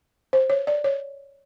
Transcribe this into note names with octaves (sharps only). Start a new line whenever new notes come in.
C5
C#5
D5
C#5